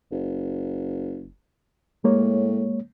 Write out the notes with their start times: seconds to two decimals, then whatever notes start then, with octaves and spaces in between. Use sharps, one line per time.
0.11 F#1
2.04 A2 G#3 A#3 C#5